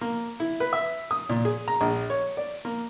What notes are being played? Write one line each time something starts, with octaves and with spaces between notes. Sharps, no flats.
A#3
E4
B4
E5
D#6
A#2
G#4
A#5
A#1
C#5
D5
A#3